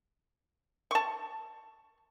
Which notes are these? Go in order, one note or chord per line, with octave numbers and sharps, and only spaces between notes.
A5 C#6